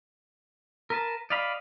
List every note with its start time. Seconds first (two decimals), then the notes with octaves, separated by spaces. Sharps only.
0.90 A#4 B4 A5
1.30 D5 D#5 F5 B5